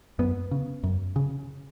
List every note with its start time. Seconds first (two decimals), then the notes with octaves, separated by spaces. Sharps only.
0.19 F#2 B3
0.51 C#3
0.84 F#2
1.16 C#3